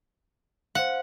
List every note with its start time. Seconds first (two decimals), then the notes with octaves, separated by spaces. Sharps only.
0.75 C5 F5 F#5